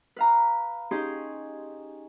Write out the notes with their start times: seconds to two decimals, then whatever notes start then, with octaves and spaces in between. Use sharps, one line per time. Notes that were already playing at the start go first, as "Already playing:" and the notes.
0.16 B4 F5 A#5
0.91 C#4 D#4 G4 G#4 C6